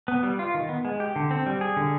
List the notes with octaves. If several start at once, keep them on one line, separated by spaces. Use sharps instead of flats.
B3
G3
F4
D#3
B3
G#3
G4
D3
C4
G3
G#4
D3